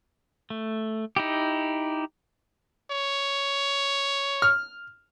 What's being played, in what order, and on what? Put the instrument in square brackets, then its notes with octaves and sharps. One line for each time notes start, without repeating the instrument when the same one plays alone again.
[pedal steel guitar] A3
D#4 E4 G4
[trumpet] C#5
[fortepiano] F6